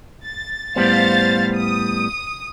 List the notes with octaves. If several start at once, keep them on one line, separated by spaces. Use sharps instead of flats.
A6
A2 G3 B3 C5 F5 A6
D#6